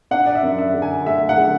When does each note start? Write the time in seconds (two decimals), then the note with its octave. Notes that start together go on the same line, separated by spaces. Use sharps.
0.11 D4 F#5
0.26 D5
0.35 E5
0.43 F#2
0.58 E5
0.74 D3
0.82 G#5
1.06 A3 E5
1.29 F#5
1.38 D3